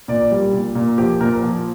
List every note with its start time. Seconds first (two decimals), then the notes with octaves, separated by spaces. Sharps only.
0.08 A#2 D5
0.31 G3
0.53 A#2
0.75 A#2
0.98 F3 G4
1.20 A#2 A#4
1.43 F3